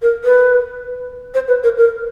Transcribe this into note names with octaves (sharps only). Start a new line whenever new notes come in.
A#4
B4
C5
B4
A#4
A#4